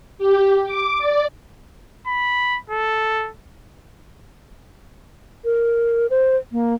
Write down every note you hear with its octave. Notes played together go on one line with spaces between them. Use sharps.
G4
D6
D5
B5
A4
A#4
C5
A#3